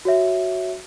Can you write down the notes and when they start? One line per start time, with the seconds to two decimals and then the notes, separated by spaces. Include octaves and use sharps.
0.05 F#4 C#5 E5